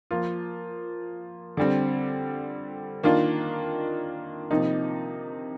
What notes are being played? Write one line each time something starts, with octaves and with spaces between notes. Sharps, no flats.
F3 A#3 F4
D3 G3 C4
D#3 A#3 D4 F4
C3 F3 A#3 D#4